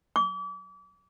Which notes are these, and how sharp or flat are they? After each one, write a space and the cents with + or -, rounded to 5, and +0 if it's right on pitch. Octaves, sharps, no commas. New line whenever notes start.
D6 -35